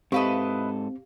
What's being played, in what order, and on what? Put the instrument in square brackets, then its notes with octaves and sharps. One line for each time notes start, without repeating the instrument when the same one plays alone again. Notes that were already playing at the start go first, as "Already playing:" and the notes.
[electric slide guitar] G#2 A4 [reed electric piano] C4 [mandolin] E4 B4 D#5 [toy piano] G4 F5